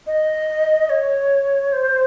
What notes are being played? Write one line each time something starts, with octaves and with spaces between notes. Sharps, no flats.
D#5
C#5
C5